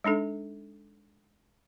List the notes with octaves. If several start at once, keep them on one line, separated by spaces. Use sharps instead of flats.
G#3 D4 D#4 A4